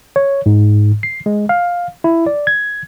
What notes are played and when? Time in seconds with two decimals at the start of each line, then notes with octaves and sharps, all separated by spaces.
0.16 C#5
0.46 G#2
1.03 C7
1.26 G#3
1.49 F5
2.04 E4
2.27 D5
2.47 G#6